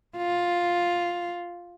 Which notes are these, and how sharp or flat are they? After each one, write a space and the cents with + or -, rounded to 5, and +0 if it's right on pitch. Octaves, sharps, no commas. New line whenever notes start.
F4 +5